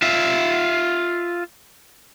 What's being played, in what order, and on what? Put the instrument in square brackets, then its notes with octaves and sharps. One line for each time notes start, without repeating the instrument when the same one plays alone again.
[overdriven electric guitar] F4 E5